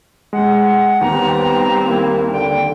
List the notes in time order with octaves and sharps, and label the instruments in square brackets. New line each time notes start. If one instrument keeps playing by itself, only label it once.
[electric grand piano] G#3 [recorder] F#5
[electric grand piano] D#2 [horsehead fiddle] G3 C4 [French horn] B3 [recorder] A#5
[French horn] A#3 [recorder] E4
[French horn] D3 [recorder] G5